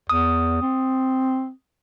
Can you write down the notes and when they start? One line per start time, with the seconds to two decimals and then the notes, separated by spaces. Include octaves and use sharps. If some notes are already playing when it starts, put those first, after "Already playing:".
0.10 E2 D#6
0.62 C4